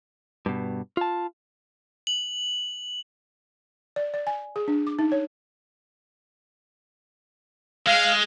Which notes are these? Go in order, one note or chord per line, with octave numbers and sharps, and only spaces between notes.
G2 B2
F4 A5
F#7
D5
D5
G#5
G#4
D4
D6
D#4
C#5
G#3 F5